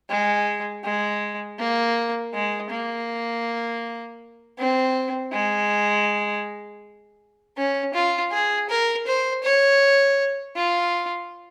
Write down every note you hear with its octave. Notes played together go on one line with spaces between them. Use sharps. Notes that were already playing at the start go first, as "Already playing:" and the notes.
G#3
G#3
A#3
G#3
A#3
C4
G#3
C#4
F4
G#4
A#4
C5
C#5
F4